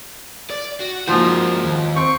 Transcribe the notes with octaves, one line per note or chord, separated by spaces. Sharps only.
D5
F#4
G#2 F3 A#3 F#4
D#2
C4 C#6